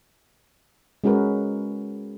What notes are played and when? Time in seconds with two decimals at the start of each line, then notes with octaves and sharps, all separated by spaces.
1.04 G#3 C#4 F#4 G#4 A#4 B4